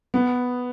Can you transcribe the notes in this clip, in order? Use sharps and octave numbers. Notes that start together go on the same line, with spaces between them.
B3